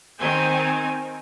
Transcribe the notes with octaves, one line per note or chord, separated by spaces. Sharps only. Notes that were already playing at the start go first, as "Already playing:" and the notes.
D#3 C4 G#5